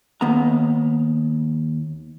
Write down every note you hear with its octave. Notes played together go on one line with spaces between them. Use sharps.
D#2 B3 F#5 A#5